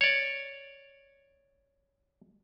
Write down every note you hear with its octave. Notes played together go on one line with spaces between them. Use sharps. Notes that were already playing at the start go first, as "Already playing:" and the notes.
C#5 D5